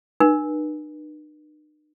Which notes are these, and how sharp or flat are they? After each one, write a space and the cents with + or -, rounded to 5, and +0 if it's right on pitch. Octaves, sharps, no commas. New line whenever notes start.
D#4 -45 B4 -40